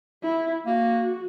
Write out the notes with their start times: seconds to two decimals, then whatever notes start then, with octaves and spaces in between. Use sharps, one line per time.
0.23 E4
0.66 A#3 F#4